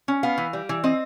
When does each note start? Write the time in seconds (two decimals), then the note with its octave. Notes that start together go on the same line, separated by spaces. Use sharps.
0.08 C#4
0.23 B3 F5
0.38 E3
0.53 G3
0.69 E3
0.84 C4 D#5